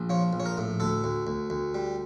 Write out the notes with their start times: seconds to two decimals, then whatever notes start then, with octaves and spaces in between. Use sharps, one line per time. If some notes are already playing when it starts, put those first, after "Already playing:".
Already playing: A#1
0.10 F3 C#5
0.33 A#1
0.40 C#5
0.46 A#4
0.57 A2
0.80 D2 A4
1.04 D2
1.27 D2
1.50 D2
1.74 G3